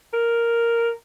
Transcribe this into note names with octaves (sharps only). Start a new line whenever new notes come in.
A#4